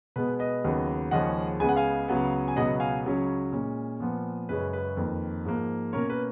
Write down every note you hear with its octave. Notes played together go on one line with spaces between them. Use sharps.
B2 G#3 B3 B4
B4 D#5
D#2 C#3 F#3 B3
D#2 C#3 F3 G#3 C#4 D#5 F#5
C#2 C#3 G#3 B3 G#5
F#5
F5 G#5
C#2 C#3 F#3 B3
G#5
C#2 B2 F#3 B3 D#5 F#5
F5 G#5
C#2 C#3 F#3 C#4
A#2 G#3 C#4
A#2 F3 B3
F#2 C#3 G#3 C#4 B4
B4
F2 D#3 A#3
G#2 F3 A#3
B2 A#3 C#4 A#4 C#5
B4